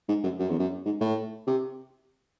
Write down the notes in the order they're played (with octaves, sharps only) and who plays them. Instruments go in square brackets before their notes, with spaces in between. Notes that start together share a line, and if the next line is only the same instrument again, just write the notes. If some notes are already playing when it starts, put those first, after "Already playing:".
[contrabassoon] G#2
F#2
F#2
E2
F#2
G#2
A2
C3